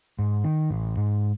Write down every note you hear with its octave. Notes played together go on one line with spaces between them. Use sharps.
G#2
D#3
A1
G#2